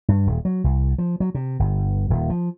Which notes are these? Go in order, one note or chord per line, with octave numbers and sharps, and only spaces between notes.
G2
D#1
F#3
C2
F3
F#3
C3
G1
D#1
F3